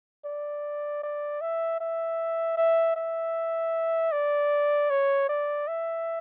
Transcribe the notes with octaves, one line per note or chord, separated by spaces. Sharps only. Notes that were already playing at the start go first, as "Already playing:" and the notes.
D5
D5
E5
E5
E5
E5
D5
C#5
D5
E5